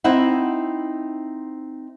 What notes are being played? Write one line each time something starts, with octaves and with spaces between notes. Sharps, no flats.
C4 D#4 E4 F#5